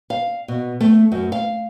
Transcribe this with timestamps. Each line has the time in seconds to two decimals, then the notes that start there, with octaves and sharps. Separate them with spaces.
0.10 F5
0.48 B2
0.81 A3
1.12 F#2
1.32 F5